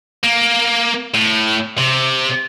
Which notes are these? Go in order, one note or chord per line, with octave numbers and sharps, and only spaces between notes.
A#3
A2
C3